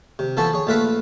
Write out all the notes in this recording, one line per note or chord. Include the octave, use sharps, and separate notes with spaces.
C3
E3 F3 B3 A4 A5 C#6
G#4 C#5
A#1 A3 F4 B4 E5